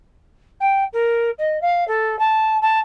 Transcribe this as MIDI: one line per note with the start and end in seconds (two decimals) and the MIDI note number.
0.60 0.84 79
0.93 1.30 70
1.38 1.60 75
1.61 1.87 77
1.88 2.19 69
2.19 2.58 81
2.61 2.79 81